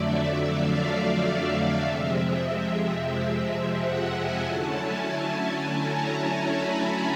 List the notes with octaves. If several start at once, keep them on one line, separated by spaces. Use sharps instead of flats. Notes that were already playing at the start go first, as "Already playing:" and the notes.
Already playing: F2 D3 F#3 A3 D5 E5
F5
E5
E5
F2 C3 F3 G#3 C4
F#5
G#5
D3 F#3 A3 C#4 E4 A5
G#5
G#5
A#5
B5
A5